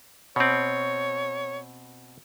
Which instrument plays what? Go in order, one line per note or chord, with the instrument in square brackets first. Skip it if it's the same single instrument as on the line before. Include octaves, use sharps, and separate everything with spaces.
[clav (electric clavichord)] B2 C4 [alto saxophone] C#5